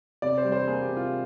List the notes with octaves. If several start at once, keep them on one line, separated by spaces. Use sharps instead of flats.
C3 D5
C5
G3
C5
A#3 G#4
G4
C3
F4